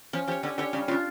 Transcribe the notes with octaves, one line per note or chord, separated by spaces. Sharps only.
F3 C#4
F3 G4 C#5
D3 C#4
D3 G4 C#5
C#3 G3
C#3 D4 F4